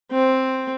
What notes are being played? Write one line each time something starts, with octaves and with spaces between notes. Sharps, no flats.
C4